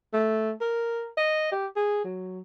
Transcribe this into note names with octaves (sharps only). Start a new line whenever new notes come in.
A3
A#4
D#5
G4
G#4
F#3